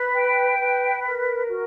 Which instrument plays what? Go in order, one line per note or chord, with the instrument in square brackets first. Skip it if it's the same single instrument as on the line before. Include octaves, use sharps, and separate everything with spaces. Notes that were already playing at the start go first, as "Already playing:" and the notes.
Already playing: [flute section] B4
G5
B4
A#4
F#4